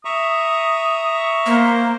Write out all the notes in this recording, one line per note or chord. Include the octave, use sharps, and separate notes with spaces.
E5 A#5 C#6 D#6
A#3 C5